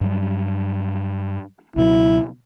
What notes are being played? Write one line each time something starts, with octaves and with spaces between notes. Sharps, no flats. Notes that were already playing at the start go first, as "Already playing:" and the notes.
G2 F#3 G3
C#2 B2 F#3 E4